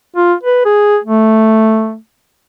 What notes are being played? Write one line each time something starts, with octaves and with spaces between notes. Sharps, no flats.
F4
B4
G#4
A3